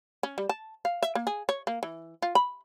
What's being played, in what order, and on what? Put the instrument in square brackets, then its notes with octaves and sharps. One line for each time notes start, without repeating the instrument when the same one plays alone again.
[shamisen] C#4
G3
A5
F5
E5
A#3
G#4
C#5
A#3
E3
F4
B5